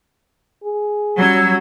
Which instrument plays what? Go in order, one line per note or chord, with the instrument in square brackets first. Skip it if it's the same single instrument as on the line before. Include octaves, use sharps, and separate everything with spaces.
[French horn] G#4
[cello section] F#3 [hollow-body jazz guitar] G3 C#4 [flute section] E6 G#6